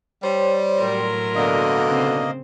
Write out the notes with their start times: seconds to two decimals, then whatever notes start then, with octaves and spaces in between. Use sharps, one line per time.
0.23 G3 C5 C#5 C6
0.81 A2 F#3 A#4 C6
1.35 B2 D3 A#3 D#5
1.88 C#3 C4